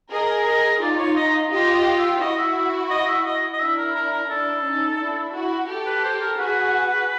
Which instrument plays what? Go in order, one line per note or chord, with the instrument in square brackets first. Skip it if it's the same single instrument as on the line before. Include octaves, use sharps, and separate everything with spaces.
[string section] G#4 A#4 [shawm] D#5
[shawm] D#5
[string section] D#4 F4 [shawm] D5
[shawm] C#5
D#5
D#5
[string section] F4 G4 [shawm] D#5
[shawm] D#5
E5
[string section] E4 F#4 [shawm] D#5
[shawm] E5
E5
D#5
E5
D#5
D#5
[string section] D4 E4 [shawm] E5
[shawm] A#4
A#4
A#4
[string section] D4 E4 [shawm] A4
[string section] C#4 D#4
D4 E4
E4 F#4
G4 A4
[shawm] B4
C5
A#4
[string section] F#4 G#4 [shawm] B4